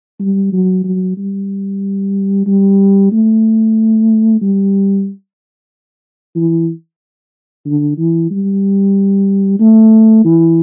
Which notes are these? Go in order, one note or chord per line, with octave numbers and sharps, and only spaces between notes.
G3
F#3
F#3
G3
G3
A3
G3
E3
D3
E3
G3
A3
E3